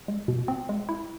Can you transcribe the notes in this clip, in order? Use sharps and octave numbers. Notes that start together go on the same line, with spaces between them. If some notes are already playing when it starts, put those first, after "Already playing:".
G#3
B2
C4
G#3
E4